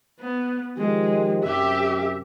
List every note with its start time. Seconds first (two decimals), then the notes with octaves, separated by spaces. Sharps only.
0.19 B3
0.77 D#3 F3 G#3 G4
1.43 F#2 C3 G4 E5